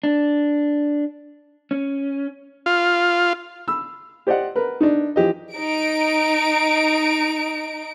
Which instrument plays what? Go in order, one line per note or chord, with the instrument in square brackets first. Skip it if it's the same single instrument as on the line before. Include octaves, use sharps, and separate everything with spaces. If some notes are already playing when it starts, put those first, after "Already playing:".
[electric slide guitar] D4
C#4
[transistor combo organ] F4
[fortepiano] B5 E6
G4 C5 D5 D#5 F#5
A#4 B4
D4 D#4
E3 F3 G4 D#5
[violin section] D#4 D7